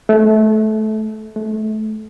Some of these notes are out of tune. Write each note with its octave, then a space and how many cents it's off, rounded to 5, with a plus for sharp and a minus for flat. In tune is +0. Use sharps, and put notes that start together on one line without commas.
A3 -20
A3 -25